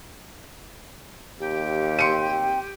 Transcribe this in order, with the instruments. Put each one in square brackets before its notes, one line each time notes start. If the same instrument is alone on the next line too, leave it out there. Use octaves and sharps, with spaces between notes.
[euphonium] D#2 [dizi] G4
[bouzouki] C4 G5 [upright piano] C6 C#7 D#7